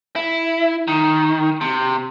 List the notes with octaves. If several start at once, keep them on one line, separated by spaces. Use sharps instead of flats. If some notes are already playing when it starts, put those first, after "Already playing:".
E4
D#3
C3